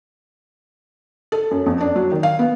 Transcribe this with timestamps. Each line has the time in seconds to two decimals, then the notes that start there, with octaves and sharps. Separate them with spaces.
1.32 A4
1.51 F#2
1.66 F2
1.81 D4
1.96 F#3
2.12 D#3
2.23 F5
2.39 B3